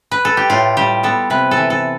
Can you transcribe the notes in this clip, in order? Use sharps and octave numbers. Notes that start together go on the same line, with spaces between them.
B4
A4
G4
A2 F4
G3 G4
B3 A4
C3 B4
A4
E3
A4